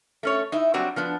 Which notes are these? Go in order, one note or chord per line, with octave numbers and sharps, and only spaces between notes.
A3 C#4 C#5
D#4 E4 E5
F#3 G3 C4 D4 F#4
F3 B3 D4